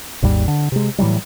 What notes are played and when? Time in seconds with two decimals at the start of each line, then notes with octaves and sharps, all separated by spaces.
0.22 G#1 D#2 G#2 G3
0.48 D3
0.72 C3 G#3
0.98 A2 E3 F#3 G3